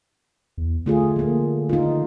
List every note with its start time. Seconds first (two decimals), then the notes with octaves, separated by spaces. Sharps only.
0.58 E2
0.86 D3 A3 F4 G#4
1.16 F3 A#3
1.69 D#4 F4